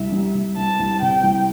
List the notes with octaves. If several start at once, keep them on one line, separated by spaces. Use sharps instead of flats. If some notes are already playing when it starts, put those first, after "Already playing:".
Already playing: C2 E5
G3
C2
C2 A5
C2
C3 G5
C2